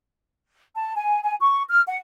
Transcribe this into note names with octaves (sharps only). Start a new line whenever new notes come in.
A5
G#5
G#5
C#6
F6
F#5